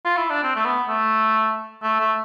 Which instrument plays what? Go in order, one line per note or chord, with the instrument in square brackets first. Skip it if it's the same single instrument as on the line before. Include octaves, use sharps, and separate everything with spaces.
[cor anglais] F4
E4
D4
C4
A3
B3
A3
A3
A3